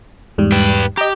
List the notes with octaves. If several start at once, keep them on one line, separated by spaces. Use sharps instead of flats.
E2 G#2 G3
B4 G5
G4 D#5 A#5